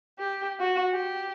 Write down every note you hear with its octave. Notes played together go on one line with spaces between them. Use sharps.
G4
F#4
G4